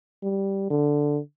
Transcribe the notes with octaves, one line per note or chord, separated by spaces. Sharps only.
G3
D3